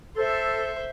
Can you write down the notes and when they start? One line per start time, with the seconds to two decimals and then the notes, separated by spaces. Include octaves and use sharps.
0.16 A4 C5 E5